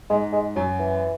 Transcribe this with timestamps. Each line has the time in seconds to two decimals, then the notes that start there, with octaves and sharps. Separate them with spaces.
0.10 G#2 G#3
0.33 G#3
0.56 F#2 F#3
0.80 E3